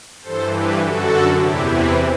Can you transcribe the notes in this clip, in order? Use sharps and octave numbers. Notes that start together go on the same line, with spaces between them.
G2 E3 A4 C5
G4 B4
F#2 D3 F#4 A4
E2 C3 E3 E4 G4
C4 E4